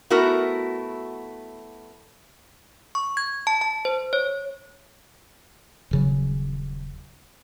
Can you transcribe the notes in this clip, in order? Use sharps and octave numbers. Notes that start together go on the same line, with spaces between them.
A3 B3 E4 F#4 A#4
C#6
G#6
A5
A5
C5
C#5
D#1 C#3 F#3